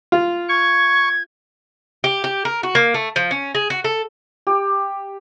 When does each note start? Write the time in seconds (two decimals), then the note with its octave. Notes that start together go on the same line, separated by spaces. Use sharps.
0.12 F4
0.49 C#6 G#6
2.04 G4
2.24 G4
2.45 A#4
2.63 F#4
2.75 A#3
2.94 A3
3.16 F3
3.31 C#4
3.55 G#4
3.70 F#4
3.84 A4
4.47 G4